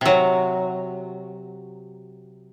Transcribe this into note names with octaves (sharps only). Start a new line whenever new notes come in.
C3 F#3